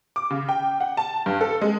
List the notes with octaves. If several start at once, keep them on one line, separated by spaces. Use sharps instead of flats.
D6
C#3
G5
F#5
A5
G2
A4
G#3